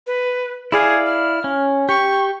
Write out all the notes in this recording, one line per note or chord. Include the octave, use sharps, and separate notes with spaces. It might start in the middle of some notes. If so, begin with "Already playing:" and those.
B4
E4 G#4 D5 F5
F6
C#4
G4 C#6